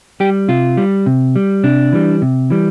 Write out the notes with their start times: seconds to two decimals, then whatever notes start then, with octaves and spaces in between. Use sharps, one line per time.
0.20 G3 G4
0.48 C3 F4
0.77 G3
1.06 C3
1.36 G3
1.64 C3 D4
1.93 E3 G3
2.22 C3
2.50 E3 G3